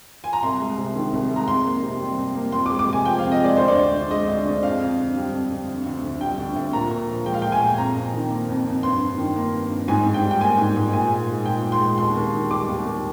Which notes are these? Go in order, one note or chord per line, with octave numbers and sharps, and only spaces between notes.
G#5
A#5
C2 C6
G#3
C3
D#3
C2
G#3
A#5
F2 C6
A#3
C3
G3
F2
A#3
F2 C6
D6
G#3
D6
C3 G#5
F3 G5
F5
F2
D#5
G#3 D5
D2 C5
D5
D2
D3
G#3 D#5
D2
D2
F2 F5
F2
D3
G3
F2
F2
D2
D2
D3
G3 G5
D2
D2
A#2 A#5
A#2
F3
G#3 G5
F5
A#2 G5
G#5
A#2
F2 A#5
F2
D#3
A#3
F2
F2
G2 C6
G2
D#3
A#3
G2
G2
G#2 G#5
G#2
G5
G3
G5
A#3 G#5
G#2
G#2
A#2 G#5
G#3
G#3
A#2 G5
A#2
C6
G#3
D#2 C6
D#2
D#3
G3 D6
D#2
D#2